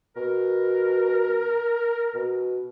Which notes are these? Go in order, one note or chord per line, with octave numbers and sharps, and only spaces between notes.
B2 A#4
B2